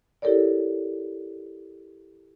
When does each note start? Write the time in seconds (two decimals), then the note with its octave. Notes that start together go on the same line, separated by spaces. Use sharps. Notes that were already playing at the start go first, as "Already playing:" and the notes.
0.22 E4 G4 A4 A#4 C#5 D5